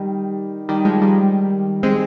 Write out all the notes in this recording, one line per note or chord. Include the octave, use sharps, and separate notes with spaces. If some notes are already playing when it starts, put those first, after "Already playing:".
Already playing: D#3 G3
D#3 G3
F3 G#3
D#3 G3
G#3 C4